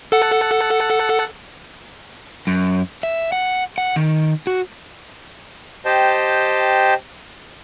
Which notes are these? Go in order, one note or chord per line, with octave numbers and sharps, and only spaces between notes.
A4 F#5
F#2
E5
F#5
F#5
D#3
F#4
G4 C5 D#5 G5 A5